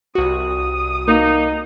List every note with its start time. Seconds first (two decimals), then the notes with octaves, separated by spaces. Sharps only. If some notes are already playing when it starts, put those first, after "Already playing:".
0.15 C2 F#4 D#6
1.07 A#3 D#4